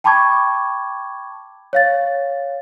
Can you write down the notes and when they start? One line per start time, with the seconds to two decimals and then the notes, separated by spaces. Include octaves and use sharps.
0.04 G5 A5 B5 C#6 D6 G#6
1.73 C#5 F5 A6